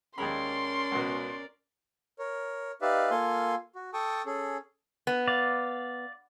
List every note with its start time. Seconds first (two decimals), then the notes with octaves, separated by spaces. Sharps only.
0.18 D#2 G#3 C#4 A#4 D5 B5 C6
0.92 C#2 B2
2.19 A#4 C#5
2.82 D#4 G4 B4 D5 E5 F5
3.11 A#3 F4 A4 F5 G#5 C6
3.75 F#4
3.93 A4 G5 A5 C#6 D#6
4.26 C#4 G#4 A4
5.07 B3
5.28 D5 F5